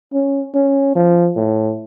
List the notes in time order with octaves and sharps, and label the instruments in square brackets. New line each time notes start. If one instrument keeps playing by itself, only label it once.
[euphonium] C#4
C#4
F3
A2